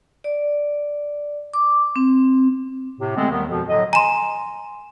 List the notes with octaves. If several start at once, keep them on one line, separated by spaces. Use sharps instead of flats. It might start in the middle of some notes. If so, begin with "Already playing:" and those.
D5
D6
C4
A2 C3
D3 G#3 A3 B3 C4
D#2 D#3 G3 A3 B3
F2 B2 F3
A2 D3 F#3 D#5
G#5 A#5 C6 E7